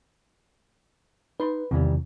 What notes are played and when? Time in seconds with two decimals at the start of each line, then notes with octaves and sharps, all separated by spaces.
1.40 D#4 B4 C6
1.71 E2 C3 D#3 E3 G3